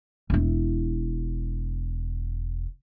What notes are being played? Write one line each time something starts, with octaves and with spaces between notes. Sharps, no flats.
E1 E4